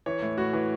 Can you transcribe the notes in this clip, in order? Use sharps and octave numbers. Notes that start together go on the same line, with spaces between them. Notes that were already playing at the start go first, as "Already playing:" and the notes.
E3 C#5
A2
A2 F#4
E3